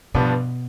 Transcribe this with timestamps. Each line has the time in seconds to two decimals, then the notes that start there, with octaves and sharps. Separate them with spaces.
0.14 G2 B2 F3 B3 D4